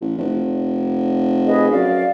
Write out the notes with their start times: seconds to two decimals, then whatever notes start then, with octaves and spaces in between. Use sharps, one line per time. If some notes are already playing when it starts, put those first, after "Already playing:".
0.01 A1
0.18 F1
1.46 G#4 B4 D#5
1.71 F#2 D5 F5